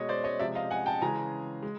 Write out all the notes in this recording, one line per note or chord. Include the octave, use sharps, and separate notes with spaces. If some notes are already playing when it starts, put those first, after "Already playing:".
Already playing: B2 G#3 C#5 D#5
C5 D5
C#5 D#5
C3 F3 G#3 D5 E5
D#5 F5
F#5 G#5
G5 A5
C#3 E3 G#3 G#5 A#5
G#3